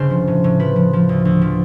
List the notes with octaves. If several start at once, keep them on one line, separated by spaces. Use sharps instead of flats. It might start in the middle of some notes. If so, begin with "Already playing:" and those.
Already playing: G1 C#3 C5
F3
A2
A2
F3 B4
F3
F3
D2
D2
F3